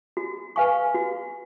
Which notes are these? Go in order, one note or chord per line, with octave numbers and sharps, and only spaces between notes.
F#4
B4 F5 G#5 C#6
F#4